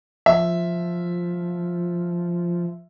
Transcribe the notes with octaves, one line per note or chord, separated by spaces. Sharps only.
F3 E5